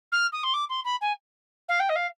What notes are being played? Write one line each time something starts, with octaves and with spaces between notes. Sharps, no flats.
F6
D#6
C6
D6
C6
B5
G#5
F5
G5
D#5
F5